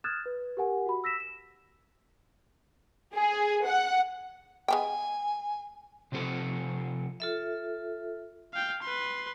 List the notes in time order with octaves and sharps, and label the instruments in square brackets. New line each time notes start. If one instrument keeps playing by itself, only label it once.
[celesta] D#6 F6 F#6 G#6 A6 E7
B4
G4 A#4 F#5 G#5
F#4 B5
E6 A#6 B6 E7
E7
[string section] G#4
F#5
[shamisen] G#3 B3 G5 [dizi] G#5
[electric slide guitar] C3 F3 C4 A4
[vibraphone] F4 A4 E5
[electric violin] F5 G5
B4 C6